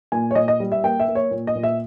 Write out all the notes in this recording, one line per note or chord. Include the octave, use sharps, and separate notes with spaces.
A#2 G#5
C#5
A#2 D#5
D#5
G3
E5
A#3 G5
E5
A#3
C#5
A#2
D#5
A#2
E5